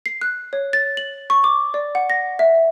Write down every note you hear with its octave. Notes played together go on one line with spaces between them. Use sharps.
C7
F#6
C#5
A6
F#7
C#6
D6
D5
F#5
A#6
E5